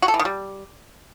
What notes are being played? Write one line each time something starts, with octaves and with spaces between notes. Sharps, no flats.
F#4
A4
E3
D#3
G3